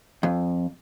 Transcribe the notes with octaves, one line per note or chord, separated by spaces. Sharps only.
F2